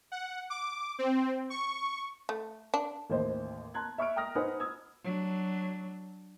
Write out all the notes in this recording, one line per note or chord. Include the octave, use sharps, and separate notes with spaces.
F#5
D6
C4
C#6
A3
D4
A1 D#2 C5 D#5
A5 A#5 C6 F#6 G#6
E5 C#6 F6 D7
G5 A#5 D#6 F6 A#6
D#4 B4 C5 F#5 G#5 D#6
D#6 E6 G#6
F#3 D4